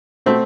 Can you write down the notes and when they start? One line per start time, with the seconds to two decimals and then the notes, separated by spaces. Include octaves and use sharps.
0.26 B2 A3 C4